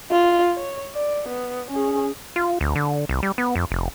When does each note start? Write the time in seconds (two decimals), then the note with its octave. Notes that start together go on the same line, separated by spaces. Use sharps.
0.11 F4
0.56 C#5
0.94 D5
1.28 B3
1.71 C#4 G#4
2.36 F4
2.61 D2
2.75 D3
3.09 C2
3.23 G3
3.38 B3
3.56 F2
3.71 F1